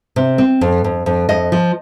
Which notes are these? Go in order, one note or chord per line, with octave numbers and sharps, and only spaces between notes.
C3
C4
F2
F2
F2
F2 D#5
F3